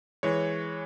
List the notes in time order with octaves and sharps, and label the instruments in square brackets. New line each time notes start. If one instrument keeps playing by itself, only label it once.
[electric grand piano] E3 G#3 C#5